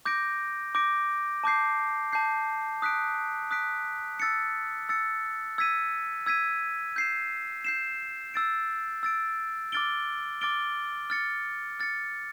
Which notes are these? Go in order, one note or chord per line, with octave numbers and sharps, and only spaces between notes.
D6 G6 A#6 D7
D6 G6 A#6 D7
A5 D6 G6 C7
A5 D6 G6 C7
D#6 F#6 B6 D7
D#6 F#6 B6 D7
E6 A6 C#7
E6 A6 C#7
E6 G#6 B6 D#7
E6 G#6 B6 D#7
G6 C7 E7
G6 C7 E7
E6 A6 D7
E6 A6 D7
D6 F6 A6 D7 G7
D6 F6 A6 D7 G7
F6 A6 C#7
F6 A6 C#7